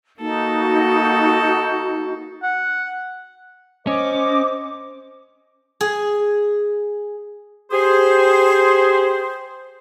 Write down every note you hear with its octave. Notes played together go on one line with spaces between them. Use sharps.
A#3 D#4 F#4 A4
F#5
C#4 C5 D#5 D6
G#4
G4 G#4 C5